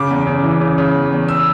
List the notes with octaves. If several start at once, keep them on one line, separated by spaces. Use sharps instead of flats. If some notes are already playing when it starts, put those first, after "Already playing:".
Already playing: C#3 D6
E2
C#3
E3
C#3
C#3
E2
E2
E6